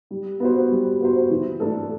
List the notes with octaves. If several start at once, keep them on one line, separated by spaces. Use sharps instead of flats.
G3
B3 F#4 C5
G3
B3 F#4 C5
E3
A3 D4 A4